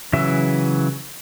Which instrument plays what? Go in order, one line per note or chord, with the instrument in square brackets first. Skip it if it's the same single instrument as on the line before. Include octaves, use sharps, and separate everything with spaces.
[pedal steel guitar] C#3 E3 F#3 E5